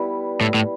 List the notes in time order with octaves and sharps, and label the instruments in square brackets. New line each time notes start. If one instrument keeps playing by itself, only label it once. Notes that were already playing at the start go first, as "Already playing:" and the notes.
Already playing: [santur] G3 B3 E4
[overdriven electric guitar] A2
A2